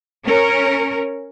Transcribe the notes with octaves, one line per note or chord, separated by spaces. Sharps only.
C#4 A#4